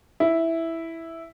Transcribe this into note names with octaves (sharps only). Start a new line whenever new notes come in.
E4